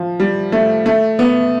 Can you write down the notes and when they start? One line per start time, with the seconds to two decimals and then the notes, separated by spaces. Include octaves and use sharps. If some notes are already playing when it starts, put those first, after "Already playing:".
Already playing: F3
0.20 G3
0.52 A3
0.86 A3
1.19 B3